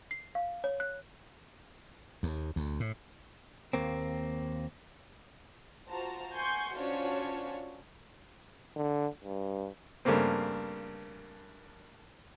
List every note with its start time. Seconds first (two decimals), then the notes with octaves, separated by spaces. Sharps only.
0.11 C7
0.35 F5
0.64 C#5
0.80 F#6
2.23 D#2
2.56 D2
2.80 A2
3.73 D#2 A#3 C4
5.89 F4 F#4 C5 A5 A#5
6.34 F#5 G#5 C6 C#6 G6
6.76 C#4 D4 F4 F#4 C5 C#5
8.76 D3
9.25 G2
10.05 G2 C#3 A3 A#3 C4